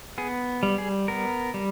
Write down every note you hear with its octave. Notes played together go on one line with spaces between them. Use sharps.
B3 G#4
G3
G#4
B3 A#4
G3